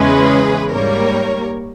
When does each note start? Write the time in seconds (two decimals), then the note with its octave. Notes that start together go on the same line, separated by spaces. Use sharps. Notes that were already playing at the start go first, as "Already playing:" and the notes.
Already playing: E2 C#3 E3 G#3 C#4 G#4 B4
0.71 G#2 G3 A#3 A#4 C#5